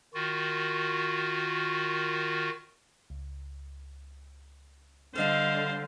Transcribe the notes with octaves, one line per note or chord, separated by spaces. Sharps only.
D#3 F4 F#4
C#2
D3 G3 A4 C5 D#5 F5 A5